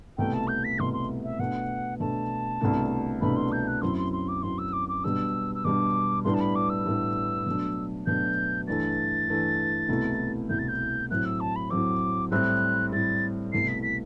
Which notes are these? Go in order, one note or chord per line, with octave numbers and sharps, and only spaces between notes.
C2 B2 A3 G5
A5
G6
B6
C2 B2 A3 C6
C6
E5
B2 A3 D4 F#5
B2 A3 D4 A5
C2 B2 A3 D4
C2 B2 A3 D4 B5
C6
G6
F#6
F#2 F#3 C4 E4 C6
C6
C6
D6
F#2 F#3 C4 E4 C6
E6
D6
D6
B2 G3 D4 E6
E6
B2 G3 D4 D6
A2 G3 B3 D4 C6
A5
B5
D6
E6
A2 G3 B3 D4
B2 F#3 A3 D4
B2 F#3 A3 D4 G6
G2 E3 A3 A6
G2 E3 A3
C2 B2 A3 E4
C2 B2 A3 E4 G6
A6
G6
A2 F#3 C4 F#6
E6
A5
B5
A2 F#3 C4 D6
A2 G3 C4 E4 F#6
A2 G3 C4 E4 A6
C2 B2 A3 E4 C7
B6
B6